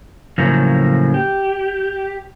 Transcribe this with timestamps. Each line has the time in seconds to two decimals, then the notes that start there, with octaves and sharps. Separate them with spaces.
0.38 A2 C#3 F3 F#3 A#3
1.14 G4